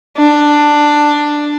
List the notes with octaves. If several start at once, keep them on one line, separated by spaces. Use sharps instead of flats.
D4